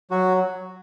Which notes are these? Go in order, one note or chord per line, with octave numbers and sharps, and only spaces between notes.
F#3 F#4